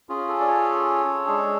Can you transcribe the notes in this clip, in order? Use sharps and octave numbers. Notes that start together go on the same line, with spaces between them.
C#4 F4 G#4
A4
D5
A4 C#5
G#3 D4 G#4